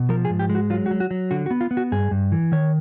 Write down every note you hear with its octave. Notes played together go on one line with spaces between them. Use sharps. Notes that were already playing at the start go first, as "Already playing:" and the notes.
Already playing: B2
F3 A#4
G#4
G#2
G4
G#3
F#4
F#3 F4
F#4
F#3
F#4
F#3
D3 F#4
F#4
B3
F4
B3
F#4
G2 G#4
G2
E3
D#3 C#5